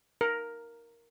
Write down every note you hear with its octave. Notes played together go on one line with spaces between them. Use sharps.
A#4